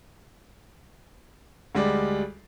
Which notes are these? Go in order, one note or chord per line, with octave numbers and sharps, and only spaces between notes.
D2 G3 G#3 G4 D5